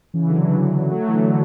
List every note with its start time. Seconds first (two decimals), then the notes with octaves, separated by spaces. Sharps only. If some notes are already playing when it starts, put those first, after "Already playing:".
0.14 C#3 E3
0.29 D3 F#3
0.91 F#3 A3
1.09 E3
1.14 D3